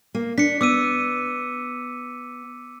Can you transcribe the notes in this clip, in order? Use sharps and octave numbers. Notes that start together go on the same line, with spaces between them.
A#3
D4 B6 C#7
B3 D6 E6 D#7